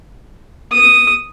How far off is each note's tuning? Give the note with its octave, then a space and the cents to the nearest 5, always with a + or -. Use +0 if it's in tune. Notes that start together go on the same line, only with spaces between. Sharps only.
D#6 -5